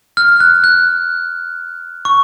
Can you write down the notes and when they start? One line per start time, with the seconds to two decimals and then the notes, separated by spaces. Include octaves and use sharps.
0.17 F6
0.40 F#6
0.64 F#6
2.05 C#6